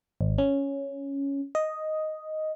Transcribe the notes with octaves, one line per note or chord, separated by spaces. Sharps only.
G#1
C#4
D#5